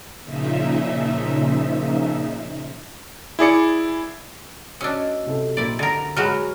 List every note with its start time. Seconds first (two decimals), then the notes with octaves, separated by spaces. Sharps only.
0.23 A#2 C#3 F3 D#4 E5
3.39 E4 G#4 D5 C#7
4.81 C#4 D4 F#4 D#5 E6
5.26 C3 C4 A4
5.57 A#1 C4 E4 G4 A#4 D5
5.79 D3 A#4 E5 A6
6.16 F#3 G#3 F#4 B4 G#5 B5 F6